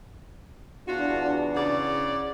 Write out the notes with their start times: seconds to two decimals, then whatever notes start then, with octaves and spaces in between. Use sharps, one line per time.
0.87 E2 D4 F4 F#4
1.55 C#3 D5 F#5